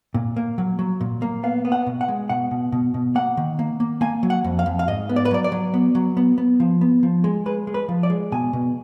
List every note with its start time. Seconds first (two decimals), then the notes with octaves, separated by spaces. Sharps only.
0.14 A#2
0.36 A#3
0.58 F#3
0.79 F#3
1.01 A#2
1.22 A#3
1.43 B3 F5
1.65 B3
1.72 F#5
1.87 B2
2.01 F#5
2.08 G#3
2.29 B2 F#5
2.51 B2
2.72 B2
2.94 B2
3.15 A#3 F#5
3.37 D#3
3.59 A#3
3.80 A#3
4.01 A#3 G#5
4.23 F#3
4.30 F#5
4.44 F2
4.59 F5
4.66 F2
4.79 F5
4.88 G#2 D#5
5.09 B3
5.16 D5
5.25 B4
5.31 F#3 D5
5.44 D5
5.52 F#3
5.74 B3
5.95 F#3
6.17 B3
6.38 B3
6.60 F3
6.81 B3
7.03 F3
7.24 G#3
7.46 G#3 B4
7.67 G#3
7.74 B4
7.89 F3
8.03 D5
8.10 G#3
8.32 B2 G#5
8.53 B2